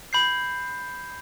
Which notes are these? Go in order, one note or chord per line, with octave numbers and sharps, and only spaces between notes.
B5 G6 C7